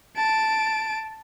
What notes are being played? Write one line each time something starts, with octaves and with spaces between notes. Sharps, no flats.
A5 D7